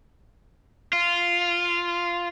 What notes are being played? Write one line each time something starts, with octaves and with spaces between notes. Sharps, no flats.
F4